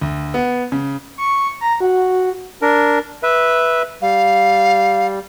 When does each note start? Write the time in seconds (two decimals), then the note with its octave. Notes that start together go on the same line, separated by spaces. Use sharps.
0.02 D2
0.34 B3
0.72 C#3
1.18 C#6
1.61 A#5
1.80 F#4
2.62 D4 A#4
3.23 B4 E5
4.02 G3 F5